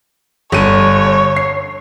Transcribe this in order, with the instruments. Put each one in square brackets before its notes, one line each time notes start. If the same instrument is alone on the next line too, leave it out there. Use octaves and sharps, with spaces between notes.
[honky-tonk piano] G1 D#7 [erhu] C#5
[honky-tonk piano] C7